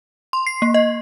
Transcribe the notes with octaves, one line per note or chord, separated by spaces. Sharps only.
C6
C7
A#3
D#5